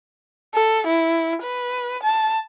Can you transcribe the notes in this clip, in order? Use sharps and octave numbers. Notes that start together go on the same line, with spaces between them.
A4
E4
B4
A5